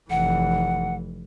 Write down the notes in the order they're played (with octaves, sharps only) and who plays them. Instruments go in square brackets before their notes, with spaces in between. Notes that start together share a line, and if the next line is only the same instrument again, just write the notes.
[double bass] F1 E3 [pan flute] F#5